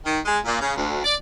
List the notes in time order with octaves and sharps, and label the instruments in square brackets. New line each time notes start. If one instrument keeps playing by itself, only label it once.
[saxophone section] D#3
G#3
A#2
C#3
D2
D5